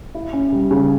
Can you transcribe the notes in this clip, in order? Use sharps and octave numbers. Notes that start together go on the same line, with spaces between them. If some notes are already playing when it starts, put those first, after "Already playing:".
E4
C#4
G3
C#3